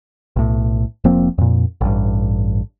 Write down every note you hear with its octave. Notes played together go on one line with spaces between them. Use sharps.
B1 A2
F1 F3 A#3 C4
F2 A#2
A1 G2